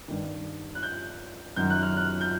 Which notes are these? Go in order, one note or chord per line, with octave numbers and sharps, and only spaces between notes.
G2 D#3
F#6
G6
F#2 D#3 G6
F#6
F6
F#6
G6